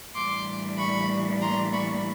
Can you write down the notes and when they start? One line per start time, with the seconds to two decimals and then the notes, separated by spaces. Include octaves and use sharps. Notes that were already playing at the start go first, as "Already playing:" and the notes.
0.15 A2 E3 G3 A#3 D4 C6 D6
0.77 B5 C#6
1.41 A#5 C6
1.72 B5 C#6